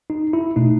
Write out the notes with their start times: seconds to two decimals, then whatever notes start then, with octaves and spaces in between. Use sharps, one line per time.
0.10 D#4
0.33 E4
0.56 B2 A3 D#4